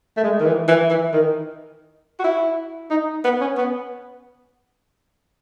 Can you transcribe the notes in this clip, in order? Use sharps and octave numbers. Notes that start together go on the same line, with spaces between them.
A3
G#3
D#3
E3
E3
E3
D#3
F#4
E4
D#4
B3
C#4
B3